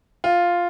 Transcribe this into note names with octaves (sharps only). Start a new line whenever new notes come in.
F4